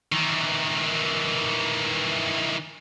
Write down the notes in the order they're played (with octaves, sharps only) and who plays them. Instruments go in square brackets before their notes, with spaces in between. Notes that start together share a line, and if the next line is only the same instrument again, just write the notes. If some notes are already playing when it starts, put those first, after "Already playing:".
[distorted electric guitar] D#3 E3